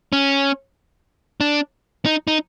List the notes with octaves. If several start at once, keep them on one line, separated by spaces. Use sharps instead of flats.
C#4
D4
D#4
D#4